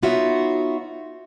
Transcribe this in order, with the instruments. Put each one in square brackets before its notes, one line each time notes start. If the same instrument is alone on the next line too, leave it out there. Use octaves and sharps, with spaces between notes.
[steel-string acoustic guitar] B3 D#4 F4 F#4 C#5 E5